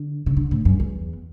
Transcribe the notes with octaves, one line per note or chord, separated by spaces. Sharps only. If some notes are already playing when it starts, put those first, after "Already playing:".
Already playing: D3
C#3
D3
A2
F#2
E2